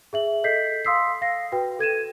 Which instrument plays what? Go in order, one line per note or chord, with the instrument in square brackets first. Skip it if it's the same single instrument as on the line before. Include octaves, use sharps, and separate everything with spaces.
[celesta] G#4 E5 F#7
A4 D#5 G6 B6 C7
F5 C6 D#6 E6 B6 C7
F5 A#6 C7
F#4 B4 G5
A4 G#6 D#7 E7